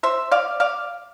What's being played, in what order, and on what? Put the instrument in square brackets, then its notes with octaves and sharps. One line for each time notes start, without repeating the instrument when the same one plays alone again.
[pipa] C5 E5
D5 F5
D5 F5